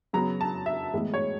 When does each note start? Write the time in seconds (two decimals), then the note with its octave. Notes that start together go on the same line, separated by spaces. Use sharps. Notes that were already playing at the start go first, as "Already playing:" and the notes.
0.13 C#3 F#3 B3 A#5
0.41 A5
0.66 E5
0.93 A2 E3 G#3 B3
1.14 C#5